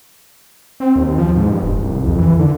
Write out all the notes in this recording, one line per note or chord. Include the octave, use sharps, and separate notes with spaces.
C4
D#2
F3
G#2
G2
E1
C2
F2
E3
D3